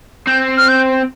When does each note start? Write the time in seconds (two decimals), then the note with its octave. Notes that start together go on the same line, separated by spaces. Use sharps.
0.27 C4 G6
0.57 F6
0.69 G6